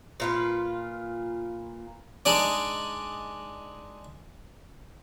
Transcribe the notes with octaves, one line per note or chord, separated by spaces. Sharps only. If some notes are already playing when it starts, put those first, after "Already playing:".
A#2 F4 B4
G#3 D4 D#4 G#4 D5